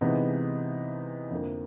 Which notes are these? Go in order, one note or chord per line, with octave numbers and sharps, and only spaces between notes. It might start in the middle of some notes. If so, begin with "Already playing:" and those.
C3 E3 G#3 B3 D#4
F2 D3 F3 A#3